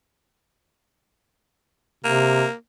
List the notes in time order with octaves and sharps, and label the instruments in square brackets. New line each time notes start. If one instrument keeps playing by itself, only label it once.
[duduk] C3 [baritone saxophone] A#3